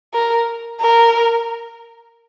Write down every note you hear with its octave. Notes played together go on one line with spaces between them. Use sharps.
A#4
A#4